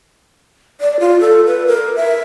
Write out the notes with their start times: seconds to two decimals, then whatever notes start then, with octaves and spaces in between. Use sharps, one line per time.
0.81 D5
1.00 F4
1.20 A4
1.46 B4
1.67 A#4
1.96 E5